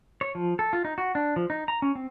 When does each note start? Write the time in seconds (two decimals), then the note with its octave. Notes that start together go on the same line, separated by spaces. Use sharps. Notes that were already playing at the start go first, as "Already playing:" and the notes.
0.21 C#5
0.35 F3
0.59 A4
0.73 F4
0.85 D#4
0.98 F#4
1.15 D4
1.36 F3
1.50 D#4
1.68 A#5
1.82 C#4
1.95 C4